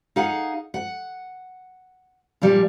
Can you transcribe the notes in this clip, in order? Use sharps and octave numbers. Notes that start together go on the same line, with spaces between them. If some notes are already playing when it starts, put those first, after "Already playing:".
D#4 G#4 F5 F#5
F#5
A#2 F3 G3